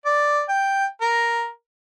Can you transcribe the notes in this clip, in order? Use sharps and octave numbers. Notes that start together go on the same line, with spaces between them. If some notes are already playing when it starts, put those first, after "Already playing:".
D5
G5
A#4